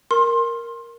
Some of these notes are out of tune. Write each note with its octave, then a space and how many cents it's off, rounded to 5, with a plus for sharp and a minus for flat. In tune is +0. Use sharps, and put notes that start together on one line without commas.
A#4 +0 C6 +20